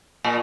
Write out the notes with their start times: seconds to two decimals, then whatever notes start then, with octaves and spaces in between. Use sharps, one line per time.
0.24 A#2